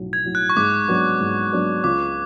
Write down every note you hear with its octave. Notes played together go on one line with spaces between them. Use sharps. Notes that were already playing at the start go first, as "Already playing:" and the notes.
Already playing: B1 A2 F#3
G#6
A2 F#3
F#6
C#6
G#2 D6
F#3 B3 D4
G#2
F#3 B3 D4
C#2 D6